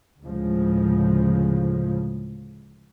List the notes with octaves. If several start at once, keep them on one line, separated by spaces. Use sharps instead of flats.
D2 A2 C#3 F3 G#3